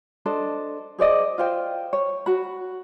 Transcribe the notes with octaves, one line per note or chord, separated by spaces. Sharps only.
D4 A4 C5 D#5
G#4 C5 D5 D#5
F4 C5 G5
C#5
F#4 B5